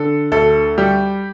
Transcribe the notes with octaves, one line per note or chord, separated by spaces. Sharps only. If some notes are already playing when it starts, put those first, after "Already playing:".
Already playing: D3 A4
D2 A4
G3 G4